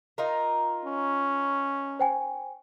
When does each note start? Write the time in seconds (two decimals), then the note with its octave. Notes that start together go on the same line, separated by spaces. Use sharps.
0.18 D#4 F4 A#4
0.85 C#4
1.99 C5 G5 G#5